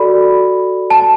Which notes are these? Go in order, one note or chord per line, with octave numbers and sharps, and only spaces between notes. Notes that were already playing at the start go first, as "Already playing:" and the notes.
Already playing: F#4 A4 D5 B5
A5